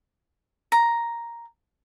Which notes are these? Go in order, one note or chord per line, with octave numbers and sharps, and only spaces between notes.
A#5